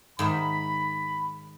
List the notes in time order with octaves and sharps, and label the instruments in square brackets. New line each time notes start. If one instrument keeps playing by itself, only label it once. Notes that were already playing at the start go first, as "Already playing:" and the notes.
[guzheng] G#2 D#3 E5 [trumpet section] B5